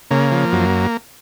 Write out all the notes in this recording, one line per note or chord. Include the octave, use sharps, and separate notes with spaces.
C#3 A#3
F3
F#2